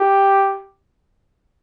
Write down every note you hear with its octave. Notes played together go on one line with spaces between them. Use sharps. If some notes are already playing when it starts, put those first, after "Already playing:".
Already playing: G4